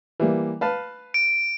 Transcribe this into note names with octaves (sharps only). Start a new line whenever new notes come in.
E3 G3 A#3
B4 F5 A5
D7